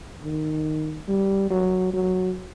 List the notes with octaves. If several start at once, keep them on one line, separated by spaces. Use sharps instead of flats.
D#3
G3
F#3
F#3